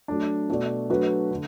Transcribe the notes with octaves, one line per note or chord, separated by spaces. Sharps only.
F#3 A3 D4
B2 A3 F#4 D5
F#3 A3 D4 F#4 B4
D3